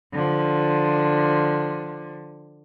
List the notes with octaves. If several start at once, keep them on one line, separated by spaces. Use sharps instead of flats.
D3 F3